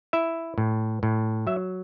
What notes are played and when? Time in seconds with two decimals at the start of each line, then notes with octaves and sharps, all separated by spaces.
0.13 E4 E5
0.58 A2
1.03 A2
1.47 F#3 E5